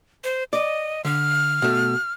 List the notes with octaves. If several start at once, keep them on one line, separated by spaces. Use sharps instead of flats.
C5
D5 D#5
D3 F6
B2 A3